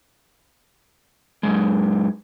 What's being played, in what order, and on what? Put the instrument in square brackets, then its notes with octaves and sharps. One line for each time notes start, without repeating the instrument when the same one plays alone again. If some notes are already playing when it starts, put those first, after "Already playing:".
[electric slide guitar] F#2 C#3 G#3